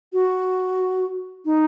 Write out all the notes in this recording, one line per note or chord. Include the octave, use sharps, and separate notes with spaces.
F#4
D#4